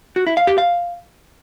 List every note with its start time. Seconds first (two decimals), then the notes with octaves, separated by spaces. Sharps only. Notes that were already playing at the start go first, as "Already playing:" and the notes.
0.16 F#4
0.27 E4
0.37 F5
0.47 G4
0.58 F5